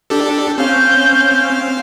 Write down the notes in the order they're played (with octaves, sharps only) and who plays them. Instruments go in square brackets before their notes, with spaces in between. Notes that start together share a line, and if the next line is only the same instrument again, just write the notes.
[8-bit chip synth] D4 G4 A4
[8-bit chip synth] C4 F5 [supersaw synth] C#4 [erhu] G6